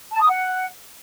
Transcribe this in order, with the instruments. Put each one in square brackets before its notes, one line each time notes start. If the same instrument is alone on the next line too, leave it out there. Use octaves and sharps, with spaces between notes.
[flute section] A5
D#6
F#5